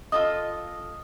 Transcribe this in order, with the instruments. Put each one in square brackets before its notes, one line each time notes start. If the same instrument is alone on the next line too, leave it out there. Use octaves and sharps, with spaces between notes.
[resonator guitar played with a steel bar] F4 A4 D#5 [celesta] D#6